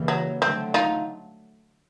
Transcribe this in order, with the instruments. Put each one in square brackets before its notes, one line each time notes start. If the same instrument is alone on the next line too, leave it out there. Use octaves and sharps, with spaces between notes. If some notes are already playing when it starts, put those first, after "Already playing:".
Already playing: [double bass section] C#3 E3 G3 A#3
[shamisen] F#3
[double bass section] D3 F#3 A3 [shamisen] C4
[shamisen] D#4 F4